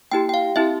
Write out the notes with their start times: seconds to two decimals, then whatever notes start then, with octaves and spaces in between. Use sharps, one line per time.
0.12 A#3 E4 G4 G5
0.29 G5
0.34 F5
0.56 C4 E4 G4 E5